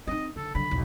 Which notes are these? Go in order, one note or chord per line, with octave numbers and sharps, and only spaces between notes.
C4 D#4 D#5
D3 A4
D3 F#3 B5
B1 E2